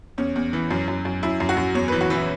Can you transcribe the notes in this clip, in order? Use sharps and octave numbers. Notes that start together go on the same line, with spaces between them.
E2 C#4
E2
E3
F#2
F#2
F#2
F#2 E4
F#2
F#4
F#2
E2 C#5
B4
E3
F#4
E3 E4